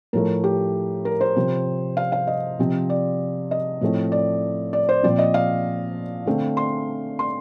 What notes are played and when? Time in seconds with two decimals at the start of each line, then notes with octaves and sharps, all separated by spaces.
0.13 A2 F3 A3 A#4
0.44 G4
1.05 A#4
1.21 C5
1.36 C3 F3 C4
1.97 F5
2.12 F5
2.27 D#5
2.59 C3 F3 C4
2.90 D5
3.51 D#5
3.81 A2 F3 A3 C4
4.12 D5
4.73 D5
4.89 C5
5.03 A#2 F3 C4 D5
5.19 D#5
5.34 F5
6.26 D3 A3 C4
6.57 C6
7.19 C6